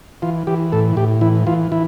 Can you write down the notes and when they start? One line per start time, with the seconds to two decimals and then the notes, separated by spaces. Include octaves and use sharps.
0.22 E3 F4
0.47 E3 G4
0.72 A2 A4
0.96 A2 G4
1.21 E3 E4
1.47 E3 F4
1.72 E3 E4